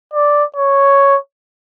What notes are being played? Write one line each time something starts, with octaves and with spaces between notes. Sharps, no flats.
D5
C#5